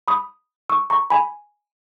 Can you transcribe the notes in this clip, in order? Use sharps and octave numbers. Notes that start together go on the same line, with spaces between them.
B5 D#6
C#6 E6
A#5 C#6
G#5 B5